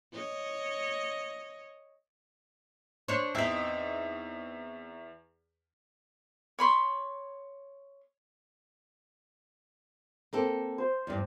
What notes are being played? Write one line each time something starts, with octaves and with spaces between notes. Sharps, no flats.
C#5 D#5
D4 C5 C#5
E2 C4 D#4 E5 B6
C#5 B5 C6
A#3 C4 A4
C5
E2 G2